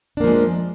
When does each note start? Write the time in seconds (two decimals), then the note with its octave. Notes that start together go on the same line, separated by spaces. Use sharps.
0.17 D4
0.20 A#3
0.24 F3
0.27 G#3